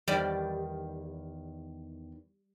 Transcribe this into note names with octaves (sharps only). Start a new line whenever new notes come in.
E2 D#3 G3 D5